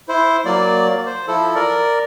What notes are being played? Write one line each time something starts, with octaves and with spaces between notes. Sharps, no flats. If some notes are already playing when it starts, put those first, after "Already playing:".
E4 C5
F#3 A#3 D5
C5
F3 E4 A4
A#4 D5